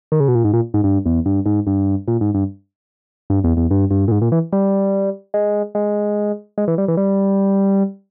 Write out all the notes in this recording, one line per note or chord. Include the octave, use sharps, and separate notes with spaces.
D#3
C#3
B2
A#2
G#2
A#2
G#2
G2
E2
G2
G#2
G2
A#2
G#2
G2
G2
E2
E2
G2
G2
A#2
G#2
A#2
E3
G3
G#3
G#3
G#3
E3
G3
E3
G3